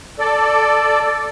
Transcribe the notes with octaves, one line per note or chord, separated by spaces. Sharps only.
A4 D5